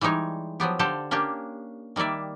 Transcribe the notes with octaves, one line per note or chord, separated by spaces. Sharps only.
E3 G3 G#3 D#4 C#5
F3 F#3 B3 G4
D3 G4 A4 C5 F5 A5
A#3 C#4 D4 G4
D#3 G3 A#3 D5 E5